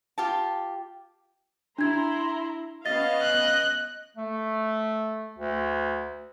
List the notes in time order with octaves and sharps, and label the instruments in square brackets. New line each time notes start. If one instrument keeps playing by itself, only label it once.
[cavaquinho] F4 G4 A5
[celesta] D4 G#6 [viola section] E4 A#5 C6
[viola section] B3 C#4 F5 [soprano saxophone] D#5 [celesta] A6
[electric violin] F#6
[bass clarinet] A3
D2